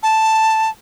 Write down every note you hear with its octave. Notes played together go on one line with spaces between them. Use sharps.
A5